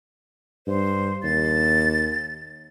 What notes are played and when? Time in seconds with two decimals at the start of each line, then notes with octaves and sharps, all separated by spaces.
0.67 G2 C5
1.23 D#2 A6